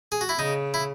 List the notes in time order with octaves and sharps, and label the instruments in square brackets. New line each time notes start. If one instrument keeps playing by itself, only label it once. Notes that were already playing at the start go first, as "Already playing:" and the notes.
[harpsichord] G#4
F#4
E4
[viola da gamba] C#3 [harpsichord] D#4
[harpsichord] E4